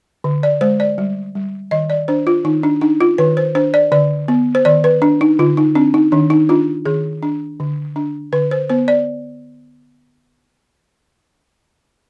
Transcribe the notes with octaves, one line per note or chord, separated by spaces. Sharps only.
D3
D5
G#3 C5
D5
G3
G3
D#3 D#5
D5
D4 C5
F4
D#3 D#4
D4
D4 D#4
F4
D#3 B4
C5
D4 C5
D5
D3 D5
B3
C5
D#3 D5
B4
D4
D#4
D3 F4
D#4
C4 D4
D#4
D#3 D4
D#4
D4 F4
D#3 G#4
D4
D3
D4
D3 B4
C5
B3 C5
D5